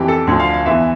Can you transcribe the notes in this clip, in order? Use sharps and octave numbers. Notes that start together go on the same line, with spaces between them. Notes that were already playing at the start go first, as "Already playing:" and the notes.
Already playing: F2 E3 G4
A4
D2 D3 F3
F5
F5
E2 E3 E5